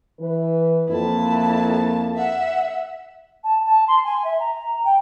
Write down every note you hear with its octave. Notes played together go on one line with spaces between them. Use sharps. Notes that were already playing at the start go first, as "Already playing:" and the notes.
E3 B4
F2 A#3 E4 A5
E5 F#5
A5
A5
C6
G#5
E5
A#5
G5